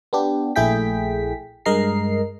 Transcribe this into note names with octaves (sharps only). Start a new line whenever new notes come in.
B3 D4 G4
A#1 A3 E4 G#4 G5 B6
G2 G#3 A#4 D#5 A#5 C7